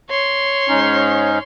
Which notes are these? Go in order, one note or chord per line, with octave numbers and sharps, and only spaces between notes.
C#5 C6
G#2 C#4 D#4